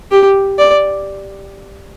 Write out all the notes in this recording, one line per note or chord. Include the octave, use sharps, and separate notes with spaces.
G4
D5